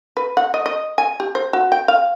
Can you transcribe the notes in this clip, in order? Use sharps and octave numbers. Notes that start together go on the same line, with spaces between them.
B4
F#5
D#5
D#5
G#5
G4
C5
F#4
G5
F5